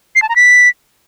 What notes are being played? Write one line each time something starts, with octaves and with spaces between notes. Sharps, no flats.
C7
A5
A#5
B6